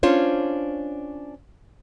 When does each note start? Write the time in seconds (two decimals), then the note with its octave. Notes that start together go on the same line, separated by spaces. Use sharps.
0.03 C#4 D4 F4 C5 C#5